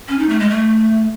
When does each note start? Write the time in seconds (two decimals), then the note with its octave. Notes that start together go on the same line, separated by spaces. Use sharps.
0.08 C#4
0.19 D#4
0.29 A3
0.40 G#3
0.50 A3